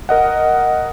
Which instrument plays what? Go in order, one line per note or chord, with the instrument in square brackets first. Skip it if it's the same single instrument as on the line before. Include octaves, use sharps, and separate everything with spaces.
[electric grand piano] A#4 D#5 F#5